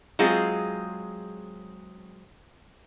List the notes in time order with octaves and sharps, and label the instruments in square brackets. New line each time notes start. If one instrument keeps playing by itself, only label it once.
[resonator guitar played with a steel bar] F#3 G#3 C4 F4 G#4